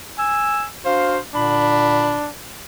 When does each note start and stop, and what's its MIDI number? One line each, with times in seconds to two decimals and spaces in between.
0.19 0.65 80
0.19 0.65 88
0.85 1.19 62
0.85 1.19 66
0.85 1.19 72
0.85 1.19 77
1.35 2.22 46
1.35 2.22 50
1.35 2.30 62
1.35 2.22 83